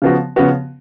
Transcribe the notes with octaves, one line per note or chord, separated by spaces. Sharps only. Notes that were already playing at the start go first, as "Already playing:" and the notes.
C#3 F3 B3 F#4
C#3 F3 B3 F#4